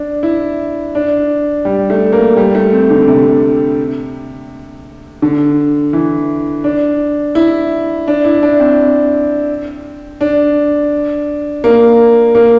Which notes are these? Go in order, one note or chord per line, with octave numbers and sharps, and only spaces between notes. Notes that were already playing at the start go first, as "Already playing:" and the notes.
Already playing: D4
E4
D4
G3
A3
A#3
G3
A3
C4
D3
C3
D3
E3
D4
E4
D4
E4
D4
C4
D4
A#3
A#3